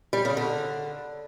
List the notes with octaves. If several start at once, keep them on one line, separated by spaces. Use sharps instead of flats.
G3
C#3
D3